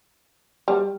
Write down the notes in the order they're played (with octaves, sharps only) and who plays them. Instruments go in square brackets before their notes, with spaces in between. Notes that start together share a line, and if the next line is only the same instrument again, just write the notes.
[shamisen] G3